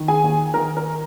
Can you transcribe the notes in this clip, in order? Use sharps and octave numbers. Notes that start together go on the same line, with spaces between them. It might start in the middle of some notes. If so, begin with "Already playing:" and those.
Already playing: D#3
G#4 G#5
D#2
D#3 A#4 A#5
A#4 A#5